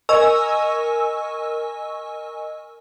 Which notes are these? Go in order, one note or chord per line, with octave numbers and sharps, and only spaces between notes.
A#4 D#5 G#5 C#6 E6